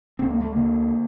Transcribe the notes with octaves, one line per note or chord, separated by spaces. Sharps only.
D2 C4
A#3
A3
D3 A#3